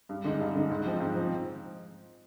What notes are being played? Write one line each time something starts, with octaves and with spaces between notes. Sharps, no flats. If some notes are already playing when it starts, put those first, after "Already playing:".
G2
D3 G#3 D#4
G2
D3 G#3 D#4
G#2
F3 C4 D#4
G#2
F3 C4 D#4